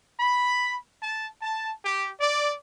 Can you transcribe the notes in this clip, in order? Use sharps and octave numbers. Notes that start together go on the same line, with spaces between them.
B5
A5
A5
G4
D5